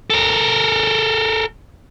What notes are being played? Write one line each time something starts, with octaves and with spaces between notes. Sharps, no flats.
A4 A#4